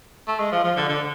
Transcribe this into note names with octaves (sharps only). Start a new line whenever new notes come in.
A3
G#3
F3
F3
D3
D3